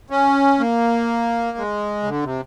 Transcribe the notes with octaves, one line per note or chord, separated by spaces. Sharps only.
C#4
A#3
G#3
C#3
D3
C3